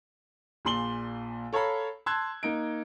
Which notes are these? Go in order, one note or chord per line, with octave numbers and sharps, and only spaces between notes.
A#1 A#2 C6 F#7 G7
A4 C#5 F5 A#5 B5
A5 C6 E6 F#6 G#6
A#3 D#4 D7